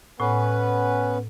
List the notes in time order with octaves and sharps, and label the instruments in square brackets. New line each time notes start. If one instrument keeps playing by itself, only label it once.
[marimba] A2 [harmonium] B3 C#4 B4